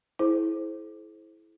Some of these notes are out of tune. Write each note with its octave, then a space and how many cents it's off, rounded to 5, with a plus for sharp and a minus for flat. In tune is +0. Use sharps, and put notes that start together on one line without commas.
E4 -10 G#4 +45 C5 +5